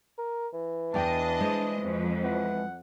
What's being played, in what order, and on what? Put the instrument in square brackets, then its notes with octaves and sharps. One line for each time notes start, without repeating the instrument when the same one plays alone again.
[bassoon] A#4
E3
[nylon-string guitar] E2 D5 G5 [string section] D4 D#5 [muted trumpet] A5
[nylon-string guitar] G#3 C5
[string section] F2
[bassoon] E3 [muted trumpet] F#5